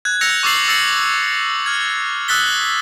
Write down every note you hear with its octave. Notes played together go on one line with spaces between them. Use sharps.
F#6 G#6
E6 F#6 G6 A#6 C#7 F7
C#6 D6 E6 A6 C7 F#7
E6 A6 C7 C#7 F#7
F6 G#6
D#6 E6 F#6 A6 B6 G7